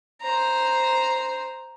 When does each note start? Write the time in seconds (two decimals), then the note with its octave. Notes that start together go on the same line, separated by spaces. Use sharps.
0.22 C5 A#5